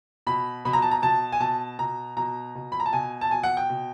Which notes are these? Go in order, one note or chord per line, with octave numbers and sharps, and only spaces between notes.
B2 B5
B2 B5
A#5
A5
A#5
B2 A5
G#5
B2 A5
B2 A#5
B2 A#5
B2
B5
A#5
A5
B2 G#5
A5
B2 G#5
F#5
G5
B2